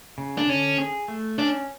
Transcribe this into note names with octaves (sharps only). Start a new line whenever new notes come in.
C#3
D4
D3 C#4
G#4
A3
C#4 D4